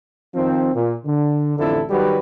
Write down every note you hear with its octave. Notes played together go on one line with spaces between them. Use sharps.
D#3 F3 C4
A#2
D3
A1 F2 D3 E4 A4
D#3 F#3 G3 F#4 B4